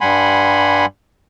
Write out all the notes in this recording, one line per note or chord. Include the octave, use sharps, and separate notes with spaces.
G2 G3 F#5 G#5 B5 C6